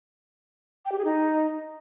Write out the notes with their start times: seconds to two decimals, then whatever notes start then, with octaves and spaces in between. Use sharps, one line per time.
0.85 G5
0.92 G4
0.98 G#4
1.05 D#4